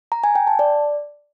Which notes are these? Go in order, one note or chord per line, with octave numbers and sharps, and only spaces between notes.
A#5
G#5
G5
A5
D5